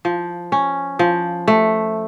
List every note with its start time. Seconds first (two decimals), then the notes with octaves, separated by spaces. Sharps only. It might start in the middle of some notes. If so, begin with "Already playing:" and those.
0.05 F3
0.52 C#4
0.99 F3
1.48 A3